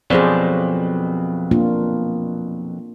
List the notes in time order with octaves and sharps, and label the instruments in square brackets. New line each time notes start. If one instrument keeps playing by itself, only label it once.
[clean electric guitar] F2 B2 F#3 [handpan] G#4 C5 D5
[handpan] A#3 D4 F4